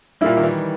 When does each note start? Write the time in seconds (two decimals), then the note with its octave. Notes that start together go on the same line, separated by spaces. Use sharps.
0.21 A#2 G3 A#3 E4
0.37 D#3
0.43 E3